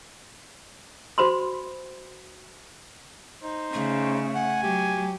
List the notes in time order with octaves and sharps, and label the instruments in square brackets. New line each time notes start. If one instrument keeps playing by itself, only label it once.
[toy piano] F#4 C5 B5 C6
[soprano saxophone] D#4 [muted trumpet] C5
[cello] C#3 [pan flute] A3
[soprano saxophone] F#5 [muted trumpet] G#5
[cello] F#3 [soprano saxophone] G4